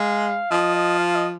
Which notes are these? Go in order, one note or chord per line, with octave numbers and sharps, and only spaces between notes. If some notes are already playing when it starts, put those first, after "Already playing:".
Already playing: G#3 F5
F3 D#5
D#5
F5
D#5